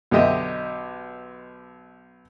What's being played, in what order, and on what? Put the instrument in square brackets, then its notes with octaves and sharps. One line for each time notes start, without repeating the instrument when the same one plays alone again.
[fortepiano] B1 D3 G4 D#5 E5